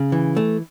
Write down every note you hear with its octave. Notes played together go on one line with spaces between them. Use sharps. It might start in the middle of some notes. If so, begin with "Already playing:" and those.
Already playing: C#3
E3
A3